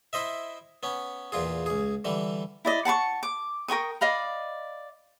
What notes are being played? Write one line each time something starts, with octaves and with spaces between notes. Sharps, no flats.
E4 C5 D#5 E5
B3 C#4
E2 A#2 F4 G#4
C#2 G#4
D3 E3 G3
E4 D5 D#5
F#5 A5 B5 C#6
D6
A#4 G5 C#6 D#6
D5 D#5 F5 B5